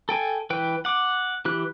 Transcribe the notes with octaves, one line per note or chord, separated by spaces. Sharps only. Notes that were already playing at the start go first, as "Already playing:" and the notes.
A4 G5 G#5
E3 B4 G5
F#5 D6
E3 G4 F#6